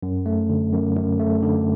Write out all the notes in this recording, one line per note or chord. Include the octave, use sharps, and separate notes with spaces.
F#2
A3
D3
F#2
F#2
A3
D3